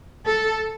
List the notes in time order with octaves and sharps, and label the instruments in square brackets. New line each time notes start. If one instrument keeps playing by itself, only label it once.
[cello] A4